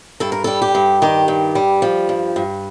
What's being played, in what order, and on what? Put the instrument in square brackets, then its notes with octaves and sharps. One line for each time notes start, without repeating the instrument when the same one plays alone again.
[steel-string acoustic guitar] G2 A4
A#4
G3 A4
G4
G2
D#3 G4
G2
G3
F3
G2
G2